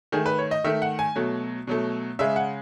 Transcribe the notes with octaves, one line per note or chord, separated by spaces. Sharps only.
D#3 A3 G#4
B4
C#5
D#5
D#3 A3 E5
F#5
G#5
B2 F#3 A3
B2 F#3 A3
C#3 G#3 E5
F#5